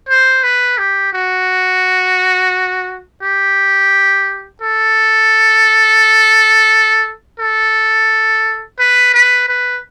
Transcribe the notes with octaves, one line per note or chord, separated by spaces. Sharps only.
C5
B4
G4
F#4
G4
A4
A4
B4
B4
B4